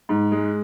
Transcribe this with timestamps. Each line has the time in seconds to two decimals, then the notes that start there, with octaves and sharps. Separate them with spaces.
0.09 G#2
0.32 G#3